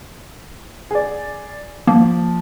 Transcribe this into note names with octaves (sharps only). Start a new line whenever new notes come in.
G#4 D5
F3 A#3